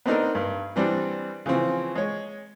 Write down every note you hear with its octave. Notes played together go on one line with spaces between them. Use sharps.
B3 C4 D4 D#4 A4 A#4
G2
E3 G3 C4 D4
C#3 E3 F3 C4
G#3 C#5